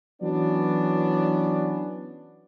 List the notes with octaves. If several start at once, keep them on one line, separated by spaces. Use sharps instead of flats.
E3 F#3 B3 C#4 D4 D5